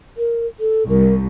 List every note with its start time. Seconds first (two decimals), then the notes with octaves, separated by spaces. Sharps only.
0.17 A#4
0.60 A4
0.89 C2 A#4